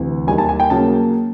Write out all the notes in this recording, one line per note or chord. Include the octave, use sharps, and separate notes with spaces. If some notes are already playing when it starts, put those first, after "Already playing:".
Already playing: D2 C3 E3
D#2 D#3 G3 G#5
A5
G#5
G5
C#3 F#3 A#3 A5